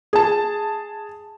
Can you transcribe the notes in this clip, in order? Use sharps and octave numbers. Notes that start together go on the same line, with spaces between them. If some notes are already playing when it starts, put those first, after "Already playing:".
G#4 A5